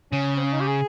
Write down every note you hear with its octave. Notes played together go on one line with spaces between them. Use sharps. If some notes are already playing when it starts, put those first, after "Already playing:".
C#3 C#4
C4
C#4
D#4
G4
G#4